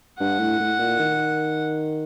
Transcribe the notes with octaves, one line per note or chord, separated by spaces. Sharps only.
G2 F#5
A2
A2
A#2
D#3